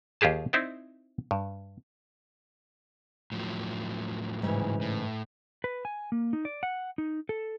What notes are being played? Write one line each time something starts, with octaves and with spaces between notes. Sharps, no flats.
D#2 F4 G4 G#4 A5
C4 D#4 E4 C5 D5
G2
A2 F3 F#3
G#2 C#3 E3
A2
B4
G#5
A#3
D#4
D5
F#5
D#4
A4